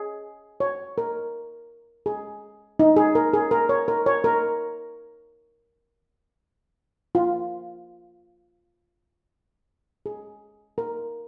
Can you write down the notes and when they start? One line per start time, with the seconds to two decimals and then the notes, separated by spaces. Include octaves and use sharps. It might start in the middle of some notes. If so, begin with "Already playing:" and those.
Already playing: G#4
0.60 C#5
0.98 A#4
2.06 G#4
2.79 D#4
2.96 G#4
3.15 A#4
3.33 G#4
3.51 A#4
3.69 C#5
3.88 A#4
4.06 C#5
4.24 A#4
7.15 F4
10.06 G#4
10.78 A#4